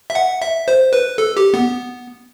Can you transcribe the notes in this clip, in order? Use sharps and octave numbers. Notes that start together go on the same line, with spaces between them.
E5
F#5
E5
C5
B4
A4
G4
B3